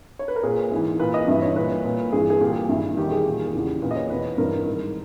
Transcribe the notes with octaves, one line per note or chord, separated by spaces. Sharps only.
C#5
B4
A#4
A#2 G#4
G#2 E3
A#2 B4
D#5
G2 E3 E5
C#5
A#2 B4
A#2
G2 E3 G#4
G#4
A#2 G4
G2 D#3 E4
E2 D#3 G4
G#4
A#2
E2 C#3 E3
A#2 B4
D#5
C#5
E2 B2 B4
G2 E3 A#4
G#2 D#3